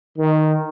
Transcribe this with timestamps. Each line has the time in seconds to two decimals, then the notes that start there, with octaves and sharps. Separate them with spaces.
0.18 D#3